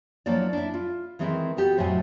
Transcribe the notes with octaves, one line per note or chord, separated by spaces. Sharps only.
F3 F#3 A#3 D4 E4 D5
D4 E4
F4
D#3 E3 G#3 C4 G#4 B4
B3 F#4 G4 A4
F2 A2 C3 F#3 D#5 G#5